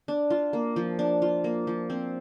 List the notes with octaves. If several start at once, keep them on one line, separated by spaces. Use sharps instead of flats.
D4
F4
A#3
F3
D4
F4
A#3
F3
C4